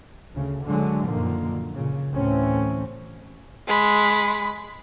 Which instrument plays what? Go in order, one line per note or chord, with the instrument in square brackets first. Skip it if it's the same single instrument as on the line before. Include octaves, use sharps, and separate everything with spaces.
[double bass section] D2 C#3
D3 F#3 G#3
F#2 A#2 D3 D#3 F3 A#3
A#2 C#3
D2 A2 E3 A3 C4 C#4
[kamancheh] G#3 B5